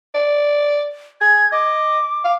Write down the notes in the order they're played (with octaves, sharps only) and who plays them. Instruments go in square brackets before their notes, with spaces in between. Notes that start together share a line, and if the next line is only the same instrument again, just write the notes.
[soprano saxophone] D5
[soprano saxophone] G#4 [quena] G#6
[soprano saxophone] D#5 [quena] D6
[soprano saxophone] F5